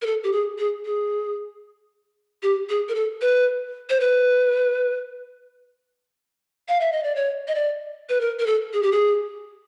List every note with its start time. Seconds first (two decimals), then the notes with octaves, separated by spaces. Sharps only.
0.02 A#4
0.06 A4
0.24 G4
0.32 G#4
0.58 G#4
0.85 G#4
2.43 G4
2.69 G#4
2.89 A#4
2.95 A4
3.22 B4
3.90 C5
4.00 B4
6.68 F5
6.80 E5
6.92 D#5
7.03 D5
7.16 C#5
7.48 D#5
7.55 D5
8.09 B4
8.21 A#4
8.40 A#4
8.47 A4
8.73 G#4
8.83 G4
8.92 G#4